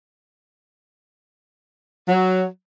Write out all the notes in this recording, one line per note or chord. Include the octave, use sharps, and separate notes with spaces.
F#3